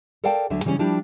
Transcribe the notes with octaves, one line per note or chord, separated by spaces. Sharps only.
A4 A#4 D5 F5 G5 A5
D2 D3 F#3 E5
C#3 E3 G3 A3 C#4
F3 G3 D4 E4 G4